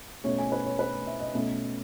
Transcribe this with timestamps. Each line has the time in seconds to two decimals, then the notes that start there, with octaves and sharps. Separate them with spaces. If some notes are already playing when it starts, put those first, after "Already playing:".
0.24 B2 A3 C#4 C#5
0.38 G#5
0.52 B4
0.65 C#5
0.79 B4
1.07 E5
1.21 D#5
1.35 B2 A3 C#4